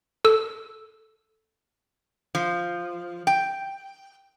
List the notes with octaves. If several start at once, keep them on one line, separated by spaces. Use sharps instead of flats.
A4 E6
F3
G5